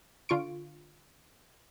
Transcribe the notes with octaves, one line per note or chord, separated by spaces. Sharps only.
D3 F4 C#6 D7